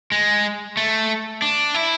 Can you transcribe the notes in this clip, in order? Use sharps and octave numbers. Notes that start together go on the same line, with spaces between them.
G#3
A3
D4
E4